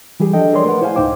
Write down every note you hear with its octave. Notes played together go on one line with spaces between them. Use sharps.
E3 G3 G4 G#4
F3 D4 A4 D#5 G5
G#4 A#4 C#5 D5 C6
A3 A#4 B4 F#5
E4 C5 C#5 F5 G#5
C#2 A2 D#4 C5 G5 D6